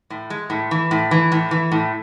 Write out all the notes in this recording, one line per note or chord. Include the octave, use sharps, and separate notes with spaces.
A2
G#3
A2
E3
A2
E3
A2
E3
A2